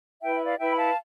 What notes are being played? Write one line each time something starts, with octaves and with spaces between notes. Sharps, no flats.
E4 B4 E5 G5
E5
D5 F5
E4 B4 E5 G5
B5
F5 A5